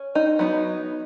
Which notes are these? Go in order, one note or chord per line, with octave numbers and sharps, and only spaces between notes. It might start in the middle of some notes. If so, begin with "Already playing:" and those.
Already playing: C#4
D#4
F#3 B3 D#4